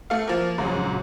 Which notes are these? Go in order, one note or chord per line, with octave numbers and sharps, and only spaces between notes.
A3 F5
F3 A#3
A#1 G#2 C#3 F#3